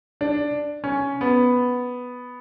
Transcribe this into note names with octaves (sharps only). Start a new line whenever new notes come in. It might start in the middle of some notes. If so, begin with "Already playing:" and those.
D4
C#4
B3